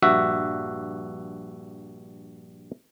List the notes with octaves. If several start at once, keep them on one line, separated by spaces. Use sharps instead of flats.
A#1 G2 F#4 E5